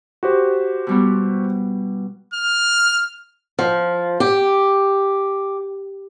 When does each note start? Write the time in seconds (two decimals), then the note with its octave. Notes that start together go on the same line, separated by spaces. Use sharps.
0.23 F#4 G4 C5
0.87 B2 G3 B3
2.34 F6
3.59 F3
4.20 G4